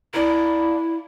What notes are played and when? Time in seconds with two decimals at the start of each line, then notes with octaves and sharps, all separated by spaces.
0.14 A#3 D4 E4